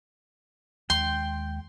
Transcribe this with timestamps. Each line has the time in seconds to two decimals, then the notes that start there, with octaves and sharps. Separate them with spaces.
0.90 D#2 G#3 G5 C6